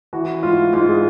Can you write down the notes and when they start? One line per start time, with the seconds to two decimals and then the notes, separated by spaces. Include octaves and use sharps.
0.13 E3 F#4
0.43 G#2 F4
0.73 G#2 F4
0.89 G#4